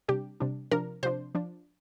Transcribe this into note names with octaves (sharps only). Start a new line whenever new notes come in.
C3 G3 D4 G4
C3 G3 D4
C3 F3 D4 A#4
C3 F3 D4 C5
F3 D4